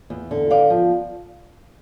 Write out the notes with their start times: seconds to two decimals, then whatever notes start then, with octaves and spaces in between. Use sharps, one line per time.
0.10 E2
0.31 D3
0.50 B3 D5 F5
0.70 F3